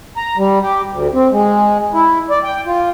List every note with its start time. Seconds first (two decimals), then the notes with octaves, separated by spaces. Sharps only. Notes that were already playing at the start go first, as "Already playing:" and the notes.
0.17 A#5
0.37 G3
0.62 G4
0.91 D2
1.14 C4
1.31 G#3
1.94 E4
2.30 D5
2.44 G5
2.66 F4